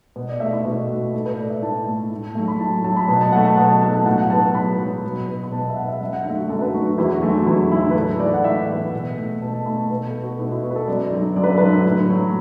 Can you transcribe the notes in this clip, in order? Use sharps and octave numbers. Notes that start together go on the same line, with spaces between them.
B2
D5
A3 E5
E4
B2 F#4
A3
A2 A4
B4
A3 D5
E5
A2 A5
A3
A2
F#3 A3
B5
A2 A5
F#3 A3 A5
B5
B2 A5
A5
F#3 A3 F#5
A5
B2 F#5
A5
F#3 A3 A5
A5
A2 F#5
F#5
F#3 B3 A5
A5
A2 B5
F#3 B3
B2
B3
B5
B2 A5
E5
B3 F#5
E5
F#2 E5
F#5
D3 A3 E5
F#4
F#2 A4
B4
D3 A3 F#4
F#4
E2 E4
F#4
D3 F#3 A3
E2 E4
D3 F#3 A3 E4
B4
A2 A4
E3 B3 D5
F#5
A2 E5
E3 B3
B2
A3
B2 A5
A5
A3 B5
A5
B2 B4
A4
B3
F#4
B2 E4
E4
B3 F#4
B4
A4
F#2 D5
D3 F#3
F#2 D5
B4
A4
D3 F#3 B4
A2
F#3 A3